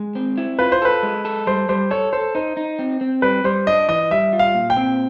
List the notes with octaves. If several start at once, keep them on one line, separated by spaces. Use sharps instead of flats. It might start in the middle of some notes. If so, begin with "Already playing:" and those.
Already playing: G#3
C4
E4
F4 B4
C5
A4 B4
G#3
A4
G3 C5
G3 C5
A4 C#5
A4 C5
D#4 C5
D#4
C4
C4
G3 B4
G3 C5
D4 D#5
E3 D#5
G3 E5
F4
F5
A#2
G5
C4